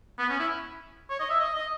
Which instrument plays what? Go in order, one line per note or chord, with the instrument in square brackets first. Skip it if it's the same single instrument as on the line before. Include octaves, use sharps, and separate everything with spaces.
[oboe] B3
C#4
E4
C#5
D#5
E5
D#5
D#5